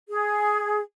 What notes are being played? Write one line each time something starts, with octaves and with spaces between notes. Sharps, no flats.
G#4